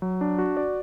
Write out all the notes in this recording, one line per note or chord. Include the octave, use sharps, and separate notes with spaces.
F#3
D4
F#4
D5